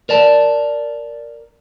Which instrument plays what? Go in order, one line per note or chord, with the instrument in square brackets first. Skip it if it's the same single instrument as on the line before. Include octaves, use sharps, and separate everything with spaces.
[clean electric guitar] A#4 D5 A5